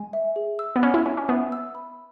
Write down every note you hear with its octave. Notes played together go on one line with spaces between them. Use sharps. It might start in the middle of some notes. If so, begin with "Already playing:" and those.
Already playing: G#3 G#5
E5
G#4
E6
B3
C#4 B5
E4
C#4 G#5
C#4
B3 E5
E6
B5